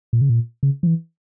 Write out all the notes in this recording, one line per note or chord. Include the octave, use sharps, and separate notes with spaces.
A#2
C#3
A#2
C#3
F3
E3